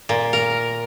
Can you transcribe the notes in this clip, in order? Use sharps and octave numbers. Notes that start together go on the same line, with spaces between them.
A#2
A#4